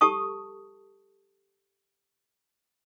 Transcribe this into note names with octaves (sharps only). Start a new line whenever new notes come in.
G4 A4 A5 C#6 D#6